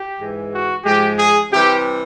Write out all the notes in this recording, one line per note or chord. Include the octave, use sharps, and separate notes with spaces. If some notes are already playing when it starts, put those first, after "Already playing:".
Already playing: G4
G#2 E3 G#3
F#4
G#2 F3 G#3 G4
G#4
C3 E3 G3 G4